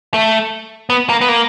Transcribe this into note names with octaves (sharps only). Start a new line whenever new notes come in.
A3
B3
A#3
B3
A#3